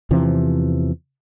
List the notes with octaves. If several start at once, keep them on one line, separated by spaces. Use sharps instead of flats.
E2 C3 E3 F3